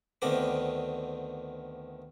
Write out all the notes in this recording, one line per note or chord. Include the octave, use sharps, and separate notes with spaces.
D2 D3 D#3 B3 C4 D6